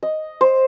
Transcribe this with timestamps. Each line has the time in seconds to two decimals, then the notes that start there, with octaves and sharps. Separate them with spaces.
0.03 D#5
0.41 C5